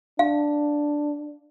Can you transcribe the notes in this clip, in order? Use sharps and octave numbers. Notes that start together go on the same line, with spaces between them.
D4 F5